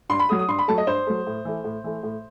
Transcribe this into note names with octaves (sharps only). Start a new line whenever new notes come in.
G2 C6
B5
F#3 A3 D#6
D#6
G2 C6
B5
F#3 A3 A5
D#5
G2 C5
F#3 A3
A2
E3 A3
A2
E3 A3
A2